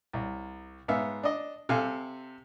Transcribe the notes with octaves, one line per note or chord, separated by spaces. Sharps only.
C2
G#2 B3 E5 F5
D4 D#5
C3 A4 F5 G#5